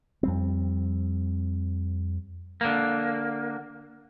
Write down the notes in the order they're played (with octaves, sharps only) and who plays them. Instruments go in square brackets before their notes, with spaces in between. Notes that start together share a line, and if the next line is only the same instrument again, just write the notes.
[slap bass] F2 G3 C4
[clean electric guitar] D3 A#3